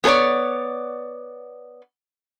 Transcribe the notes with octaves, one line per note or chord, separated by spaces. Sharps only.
B3 G#4 A4 C#5 D5